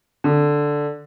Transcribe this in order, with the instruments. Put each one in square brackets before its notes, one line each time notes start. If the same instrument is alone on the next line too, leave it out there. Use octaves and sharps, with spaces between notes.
[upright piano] D3